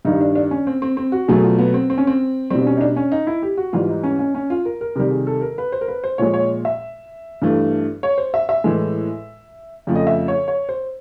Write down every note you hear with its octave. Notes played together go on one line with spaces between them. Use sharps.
G2 D#3 G3 D#4
D4
D4
C#4
C4
C4
C4
F#4
B2 F#3 A3 G#4
F4
B3
C4
C4
C#4
C4
B2 G3 C4
D4
C#4
D#4
D4
C#4
D#4
E4
G4
F#4
G#2 E3 G3 F4
D#4
C#4
C#4
C#4
F4
A#4
A#4
C3 D#3 G3 A#4
G#4
A4
A#4
B4
C5
A#4
B4
C5
A#2 F3 G#3 C#5
C#5
E5
G2 E3 A3
C#5
C5
E5
E5
A2 E3 G#3
F2 C#3 F3 A3
D#5
E5
C#5
C#5
C5